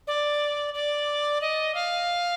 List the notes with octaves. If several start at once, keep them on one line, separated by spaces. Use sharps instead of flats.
D5
D5
D#5
F5